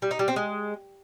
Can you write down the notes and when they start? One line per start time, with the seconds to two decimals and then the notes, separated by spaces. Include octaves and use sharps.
0.02 G3
0.11 D#4
0.19 G3
0.28 C4
0.36 G#3